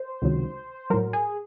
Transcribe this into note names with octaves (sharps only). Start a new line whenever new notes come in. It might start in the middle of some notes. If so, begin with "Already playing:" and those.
Already playing: C5
C#2 C3 D#3 F#3
A2 F#3 A#4
G#4